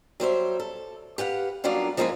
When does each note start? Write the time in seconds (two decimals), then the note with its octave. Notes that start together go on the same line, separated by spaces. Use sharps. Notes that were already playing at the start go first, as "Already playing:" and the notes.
0.20 F#3 G3 C5 E5
0.60 A4
1.18 G4 B4 F5 F#5
1.64 F#3 G3 A#3 B3 D4 F4
1.97 F3 G#3 A#3 C4 E4 F4